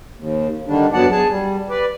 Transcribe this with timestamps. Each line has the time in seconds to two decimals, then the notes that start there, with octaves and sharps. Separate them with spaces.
0.17 D#2
0.67 D3 D#3 G3 D4
0.93 G2 F#3 B3 D5 F#5 A5
1.11 G#4 A5
1.29 G3
1.70 B4 D5